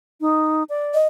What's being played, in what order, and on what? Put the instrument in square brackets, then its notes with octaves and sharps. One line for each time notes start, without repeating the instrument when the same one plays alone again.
[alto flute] D#4
D5
[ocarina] D#5